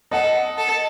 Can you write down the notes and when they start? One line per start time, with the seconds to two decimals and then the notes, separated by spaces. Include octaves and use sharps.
0.12 A4 D#5 F#5
0.58 A4